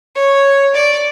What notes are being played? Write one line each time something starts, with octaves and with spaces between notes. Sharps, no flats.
C#5
D5